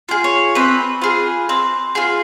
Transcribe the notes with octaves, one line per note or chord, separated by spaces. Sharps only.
F4 G#4
C#5
C4 B4
F4 G#4
C4
F4 G#4